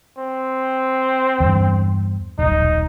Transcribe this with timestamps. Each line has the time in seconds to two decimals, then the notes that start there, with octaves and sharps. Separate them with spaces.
0.18 C4
1.40 E2 G2
2.38 D#1 B1 D#4